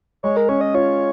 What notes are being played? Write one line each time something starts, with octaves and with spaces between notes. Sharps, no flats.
G#3 C#5
A#4
C#4 C#5
D#5
F4 C#5